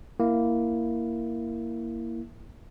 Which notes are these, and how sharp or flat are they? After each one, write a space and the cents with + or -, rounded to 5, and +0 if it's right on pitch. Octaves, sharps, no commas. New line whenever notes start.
A#3 +0 E4 +5